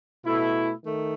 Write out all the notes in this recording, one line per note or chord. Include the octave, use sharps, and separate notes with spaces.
B2 A3 E4
D#3 A3